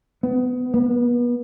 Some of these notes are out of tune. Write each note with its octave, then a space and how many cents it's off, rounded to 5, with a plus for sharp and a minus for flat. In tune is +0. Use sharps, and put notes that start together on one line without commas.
B3 +25
B3 -35